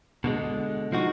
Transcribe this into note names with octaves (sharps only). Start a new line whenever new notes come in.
B2 D3 G#3
F3 D#4 F#4